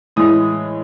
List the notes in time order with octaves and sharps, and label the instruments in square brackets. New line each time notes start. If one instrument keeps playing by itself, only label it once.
[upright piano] A2 E3 G#3 D#6